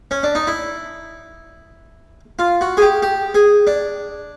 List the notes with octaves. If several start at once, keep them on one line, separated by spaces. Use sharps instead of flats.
C#4
D4
D#4
E4
F4
F#4
G#4
G4
G4
G#4
D4